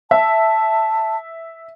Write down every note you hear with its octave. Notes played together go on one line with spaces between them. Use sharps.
E5 A5